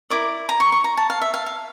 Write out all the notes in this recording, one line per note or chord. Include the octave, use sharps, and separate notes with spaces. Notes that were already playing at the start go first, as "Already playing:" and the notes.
E4 A#4 D5 D6
A#5
C#6
C#6
A#5
A5
F5
E5
F5
F5